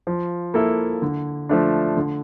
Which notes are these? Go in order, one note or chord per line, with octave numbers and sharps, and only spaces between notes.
F3
A#3 E4 A4
D3
F3 A3 D4
D3